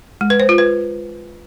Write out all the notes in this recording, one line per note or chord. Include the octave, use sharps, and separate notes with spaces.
G#3
B4
C5
F4
B4